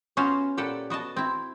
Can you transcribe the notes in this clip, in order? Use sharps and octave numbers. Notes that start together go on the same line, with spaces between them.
B3 C#4 F4 F#4 C5 F5
A#2 G4 A4 B4 F#5
B3 F#4 D#5 A5
C4 E4